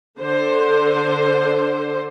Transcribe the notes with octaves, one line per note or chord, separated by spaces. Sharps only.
D3 C5